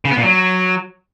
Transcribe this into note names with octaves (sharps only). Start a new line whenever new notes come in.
C#3
B3
A#2
F#3